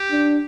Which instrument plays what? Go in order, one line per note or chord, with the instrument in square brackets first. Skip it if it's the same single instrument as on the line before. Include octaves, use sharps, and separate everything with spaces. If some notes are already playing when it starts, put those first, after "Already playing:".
Already playing: [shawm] G4
[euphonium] D4